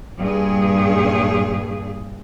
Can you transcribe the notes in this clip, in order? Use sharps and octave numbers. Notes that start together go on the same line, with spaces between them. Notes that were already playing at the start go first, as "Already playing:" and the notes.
G2 A#2 G#4